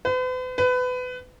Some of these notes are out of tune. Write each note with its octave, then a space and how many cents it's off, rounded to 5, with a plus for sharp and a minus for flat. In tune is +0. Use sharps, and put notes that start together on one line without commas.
B4 +45
B4 +25